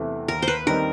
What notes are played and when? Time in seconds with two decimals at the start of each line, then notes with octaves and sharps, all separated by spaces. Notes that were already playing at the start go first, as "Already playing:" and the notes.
Already playing: E2 C3 E3 A3
0.28 D#2 A#4
0.42 C5
0.48 B4
0.67 D#3 G3 C4 D#4 A#4